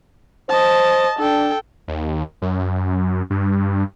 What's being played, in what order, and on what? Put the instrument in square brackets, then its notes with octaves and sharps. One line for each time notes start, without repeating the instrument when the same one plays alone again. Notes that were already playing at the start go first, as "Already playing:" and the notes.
[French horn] C5 [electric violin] D#5 A5
[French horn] D4 [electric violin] A4 G5
[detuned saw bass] D#2
F#2
G2